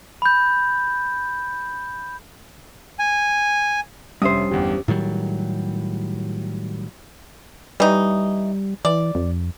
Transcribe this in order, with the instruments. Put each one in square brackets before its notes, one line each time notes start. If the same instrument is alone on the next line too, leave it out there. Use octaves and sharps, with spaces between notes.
[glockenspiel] B5 G6
[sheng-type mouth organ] G#5
[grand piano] F1 E5 D#6 [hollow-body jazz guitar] G2 C5 [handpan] C#4
[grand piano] G1 E2 [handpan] G4
[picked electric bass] A2 D#3 F#3 G3
[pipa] E3 D#4 [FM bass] G3
[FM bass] E3 [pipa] D5
[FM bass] F2